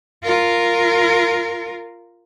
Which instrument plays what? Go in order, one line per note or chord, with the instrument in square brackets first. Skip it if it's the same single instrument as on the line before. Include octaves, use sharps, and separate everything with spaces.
[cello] F4 A#4